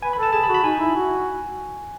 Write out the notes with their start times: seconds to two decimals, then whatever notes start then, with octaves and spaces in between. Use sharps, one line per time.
0.02 B4 G#5
0.13 B5
0.18 A4 A5
0.33 G#4 A5
0.44 B5
0.49 F#4
0.54 B5
0.64 D#4 G#5
0.80 E4
0.95 F#4